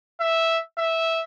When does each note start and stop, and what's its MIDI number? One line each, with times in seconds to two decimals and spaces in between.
0.20 0.58 76
0.78 1.21 76